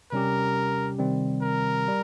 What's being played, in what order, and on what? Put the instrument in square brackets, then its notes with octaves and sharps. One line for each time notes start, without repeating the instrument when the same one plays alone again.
[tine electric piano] C3 G3 C#4 G4 [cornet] A#4
[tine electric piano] C3 D#3 G3 C4
[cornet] A#4
[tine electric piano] G3